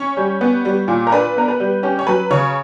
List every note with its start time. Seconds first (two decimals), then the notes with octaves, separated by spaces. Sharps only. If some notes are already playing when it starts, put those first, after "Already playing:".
Already playing: C#4 C#5
0.17 G3
0.41 B3
0.65 G3
0.88 A#2
1.07 A#4
1.12 D4 B4
1.36 B3 A#4
1.48 B4
1.60 G3
1.83 C#4 G4
1.99 C#5
2.07 F#3 B4
2.30 C#3 C#5